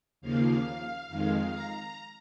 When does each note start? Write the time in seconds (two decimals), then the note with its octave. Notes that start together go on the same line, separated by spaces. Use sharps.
0.21 D#2 C#3 F3 A#3 F5
1.09 F2 D#3 G#3
1.52 A#5